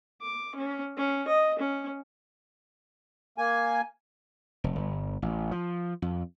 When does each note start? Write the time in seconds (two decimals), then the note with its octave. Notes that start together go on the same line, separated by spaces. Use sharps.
0.21 D6
0.55 C#4
0.97 C#4
1.27 D#5
1.59 C#4
3.38 A#3 G#5
4.64 F1
4.76 G1
5.22 A1
5.51 F3
6.02 F2